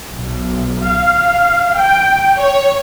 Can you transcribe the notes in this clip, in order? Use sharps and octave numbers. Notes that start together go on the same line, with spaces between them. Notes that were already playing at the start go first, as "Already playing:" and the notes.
B1
F5
G5
C#5